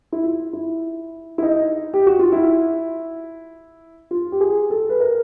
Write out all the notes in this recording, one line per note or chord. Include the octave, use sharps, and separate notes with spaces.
E4
F4
E4
E4
D#4
G4
F#4
F4
E4
F4
G4
G#4
A4
B4
A#4